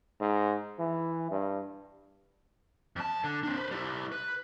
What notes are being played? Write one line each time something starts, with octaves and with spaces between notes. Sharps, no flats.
G#2
E3
G2
F2 A5
D3
C4 D4
B4 C5
G3 E4
B4